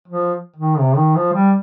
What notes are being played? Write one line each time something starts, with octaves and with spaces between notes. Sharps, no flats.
F3
D#3
C3
D#3
F3
G3